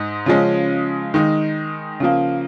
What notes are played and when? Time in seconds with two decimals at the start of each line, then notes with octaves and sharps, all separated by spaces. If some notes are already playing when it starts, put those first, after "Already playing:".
Already playing: G#2 D#4
0.26 C#3 F3 G#3 C#4
1.14 D#3 G#3 D#4
2.00 C#3 F3 A#3